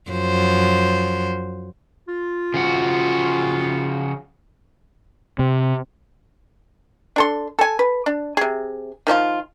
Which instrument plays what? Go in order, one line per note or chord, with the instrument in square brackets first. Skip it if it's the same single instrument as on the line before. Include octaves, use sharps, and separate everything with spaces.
[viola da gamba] F#2 F3 C5
[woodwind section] F4
[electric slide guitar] C#3 F3 F#4
[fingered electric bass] C3
[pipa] D4 A4 C6
A4 G#5
B4
D4
C3 G#4
D#3 F3 D4 F4